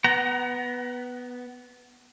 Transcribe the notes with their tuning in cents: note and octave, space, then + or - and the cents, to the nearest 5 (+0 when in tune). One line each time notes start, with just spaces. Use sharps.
B3 +0 F#5 +30 A#5 +20